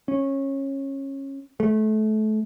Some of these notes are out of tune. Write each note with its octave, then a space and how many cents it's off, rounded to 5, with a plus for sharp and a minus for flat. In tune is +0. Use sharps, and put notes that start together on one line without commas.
C#4 -20
A3 -30